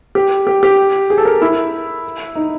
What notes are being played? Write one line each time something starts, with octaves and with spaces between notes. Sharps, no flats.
G4
G4
G4
G#4
A4
A#4
E4
D#4